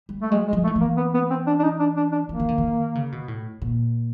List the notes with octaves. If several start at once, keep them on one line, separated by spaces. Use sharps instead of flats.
G3
A3
F#3 G#3
G#3
F3
A3
D#3
E3
A#3
B3
B3
C4
D4
D4
D#4
D4
D4
D4
E3 A#3
D#3
D3
D#3
C#3
B2
A2
A#2